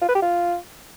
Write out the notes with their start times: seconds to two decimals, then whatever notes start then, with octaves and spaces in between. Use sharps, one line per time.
0.01 F4
0.08 B4
0.15 G4
0.22 F4